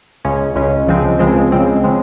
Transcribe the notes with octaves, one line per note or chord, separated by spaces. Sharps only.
C#2 C#3 G#3 C#4
C#2 C#3 G#3 C#4
C#2 C#3 F3 G#3 C4
C#2 C#3 F3 G#3 C4
C#2 C#3 F3 G#3 C4
C#3 F3 G#3 C4